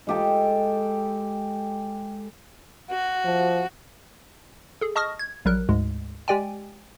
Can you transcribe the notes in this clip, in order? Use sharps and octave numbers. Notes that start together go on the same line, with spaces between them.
G#3 G4 A4
F#4
F3
G#4 A4
D#5 A5 C#6 D#6 F6 A#6
G#6
A#1 F#3 G3 A#4 F#6
D2 G#2 G#3
G#3 G4 D5 G5 G#5